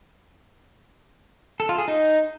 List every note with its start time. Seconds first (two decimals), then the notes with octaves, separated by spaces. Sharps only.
1.60 A4
1.69 F4
1.78 G#4
1.88 D#4